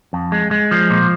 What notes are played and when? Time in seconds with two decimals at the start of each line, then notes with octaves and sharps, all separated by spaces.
0.13 F2
0.32 G#3
0.51 G#3
0.71 F3
0.90 A#2